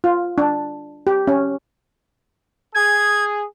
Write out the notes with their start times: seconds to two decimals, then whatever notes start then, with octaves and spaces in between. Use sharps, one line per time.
0.04 F4
0.38 D4
1.07 G4
1.27 C#4
2.75 G#4 G#6